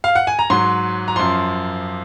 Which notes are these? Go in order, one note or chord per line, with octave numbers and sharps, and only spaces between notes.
F5
F#5
G#5
A#5
G#2 F#3 C6
A#5
F#2 F3 C6